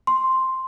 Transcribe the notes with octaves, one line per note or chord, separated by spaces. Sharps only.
C6